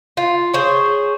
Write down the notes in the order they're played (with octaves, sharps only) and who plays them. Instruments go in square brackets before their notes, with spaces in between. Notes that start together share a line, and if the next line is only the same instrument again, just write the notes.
[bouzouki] F4
G#4 C5 C#5